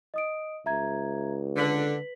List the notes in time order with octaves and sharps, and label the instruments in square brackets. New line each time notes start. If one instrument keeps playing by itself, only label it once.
[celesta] D#5 D#6 D7
[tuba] C#2 [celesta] E5 A#5 G#6
[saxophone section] D3 [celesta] B4 B6 F#7